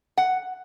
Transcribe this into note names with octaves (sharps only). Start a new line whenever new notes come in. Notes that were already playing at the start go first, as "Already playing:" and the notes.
F#5